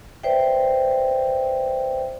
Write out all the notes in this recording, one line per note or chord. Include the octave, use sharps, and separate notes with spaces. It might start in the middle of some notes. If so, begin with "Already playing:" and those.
B4 C5 D5 E5 G5